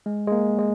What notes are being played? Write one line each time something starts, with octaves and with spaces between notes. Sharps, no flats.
G#3
G#3
A#3
G#3